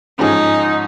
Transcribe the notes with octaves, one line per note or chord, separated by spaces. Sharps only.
G#2 F3 C#4 D#4 G#4